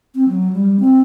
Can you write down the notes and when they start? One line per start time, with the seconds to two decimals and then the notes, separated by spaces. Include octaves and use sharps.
0.15 C4
0.29 F#3
0.53 G3
0.80 C4